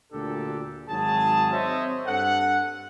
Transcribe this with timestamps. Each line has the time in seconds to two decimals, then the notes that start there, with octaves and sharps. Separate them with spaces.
0.13 D2 A#2 D4 G4 A4
0.89 G#1 F#3 G#4 A5
1.53 C4 C5 C#5 D#5 E5
2.07 G2 A4 F#5